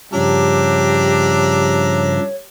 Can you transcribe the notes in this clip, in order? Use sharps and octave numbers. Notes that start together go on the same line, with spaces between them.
G2 C#3 F3 D4 G4 C#5 E5 A#5